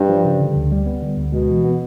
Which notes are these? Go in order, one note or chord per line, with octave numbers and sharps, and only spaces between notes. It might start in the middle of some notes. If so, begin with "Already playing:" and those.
Already playing: G2
F3
C#3
D3
D2
G3
B3
D3
D2
B2 G#3
E3
B3